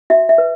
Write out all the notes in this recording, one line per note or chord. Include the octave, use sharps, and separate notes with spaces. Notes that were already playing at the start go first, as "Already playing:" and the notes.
F#4 E5
E5
B4